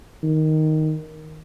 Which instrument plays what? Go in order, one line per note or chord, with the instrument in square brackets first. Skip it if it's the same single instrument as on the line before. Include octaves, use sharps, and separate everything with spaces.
[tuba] D#3